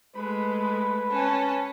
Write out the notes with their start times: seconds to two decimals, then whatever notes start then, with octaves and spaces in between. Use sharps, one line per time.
0.16 G#3 A3 B4 B5
1.11 C#4 A5